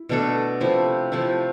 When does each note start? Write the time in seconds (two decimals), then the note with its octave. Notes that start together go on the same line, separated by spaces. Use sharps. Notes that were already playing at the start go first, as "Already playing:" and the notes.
Already playing: E4
0.09 B2 A3 D4 A4
0.61 C3 F3 A3 E4
1.12 C3 F3 A3 E4